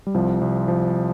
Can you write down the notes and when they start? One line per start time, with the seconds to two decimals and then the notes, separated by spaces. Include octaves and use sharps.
0.07 G3
0.14 C2 F3
0.41 C2
0.68 F3